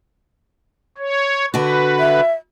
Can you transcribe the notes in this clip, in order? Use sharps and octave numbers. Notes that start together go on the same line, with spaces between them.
C#5
D3 F#4 B4
E5